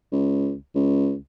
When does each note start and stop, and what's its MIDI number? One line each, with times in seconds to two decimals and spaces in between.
0.12 0.54 37
0.75 1.15 37